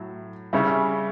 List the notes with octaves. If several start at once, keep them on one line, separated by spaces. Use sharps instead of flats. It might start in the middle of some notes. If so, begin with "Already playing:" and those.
Already playing: A2 F#3
C#3 G3 C#4 E4